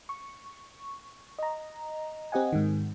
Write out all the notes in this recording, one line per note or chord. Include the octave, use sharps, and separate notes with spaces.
C#6
D#5 A#5
C4 G4 D#5 F#5 G#5
G#2 D#3